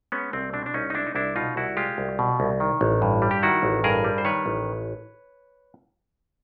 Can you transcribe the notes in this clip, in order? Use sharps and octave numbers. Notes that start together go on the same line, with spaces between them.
G#3 B3 C#4
C2 C4
B2 C4 D4
D4
C2 C#4 D#4
D#4
G#3 D4 E4
D#4
C2 D4 E4
B2 D#4 F4
C2 E4 F#4
G#3 F4 G4
C2
B2
C2
D#3
A1
G2
G3
G4
D#3 E4 F#4
A1
G2 G#4 A#4
G3
C5
D#3 B4 C#5
A1